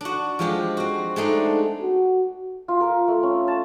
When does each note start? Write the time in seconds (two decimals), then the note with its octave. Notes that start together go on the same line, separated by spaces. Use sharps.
0.01 D4 F#4
0.39 F3 G#3 G4
0.77 C4 F#4
1.16 G#3 A3 D4 D#4
1.81 F#4
2.68 F4
2.81 A#4
3.08 A3
3.23 C#4
3.48 A5